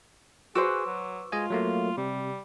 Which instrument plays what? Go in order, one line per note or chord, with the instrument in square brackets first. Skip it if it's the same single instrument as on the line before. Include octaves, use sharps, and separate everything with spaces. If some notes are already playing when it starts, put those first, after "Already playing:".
[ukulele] F#4 B4 C5 [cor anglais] G#4 [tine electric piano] D6 E6
[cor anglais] F#3
[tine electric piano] G#3 D#5 G#5 [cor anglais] F4
[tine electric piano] F#3 A3 A#3
[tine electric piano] C3 [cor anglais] G3